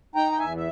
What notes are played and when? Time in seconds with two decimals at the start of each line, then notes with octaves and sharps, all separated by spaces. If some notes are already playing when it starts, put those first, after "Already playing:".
0.15 D#4 G5 A#5
0.32 G5
0.39 E2 E5 G#5
0.57 E5